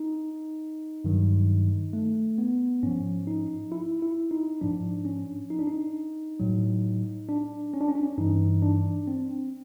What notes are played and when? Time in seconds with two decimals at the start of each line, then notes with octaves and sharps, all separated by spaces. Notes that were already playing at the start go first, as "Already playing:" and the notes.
Already playing: D#4
1.05 G2 D#3 F#3
1.93 A3
2.38 B3
2.83 G#2 F3 C#4
3.27 D#4
3.72 E4
4.02 E4
4.31 D#4
4.61 G#2 F3 D4
5.05 C#4
5.50 D#4
5.59 D4
5.67 D#4
6.40 A2 F#3
7.29 D4
7.74 C#4
7.81 D4
7.89 C#4
7.95 D4
8.03 C#4
8.18 G2 E3 D#4
8.62 D4
9.07 C4